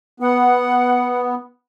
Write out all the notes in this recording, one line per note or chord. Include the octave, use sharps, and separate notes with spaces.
B3 F#5